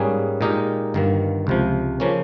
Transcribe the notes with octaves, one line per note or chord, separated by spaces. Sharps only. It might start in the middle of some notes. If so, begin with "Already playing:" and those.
Already playing: G#2 G3 A#3 C#4 G#4
A#2 G#3 D#4 G4 A#4
G1 G2 D#3 A#3
C#2 C3 F3
C#3 F3 A#3 C#4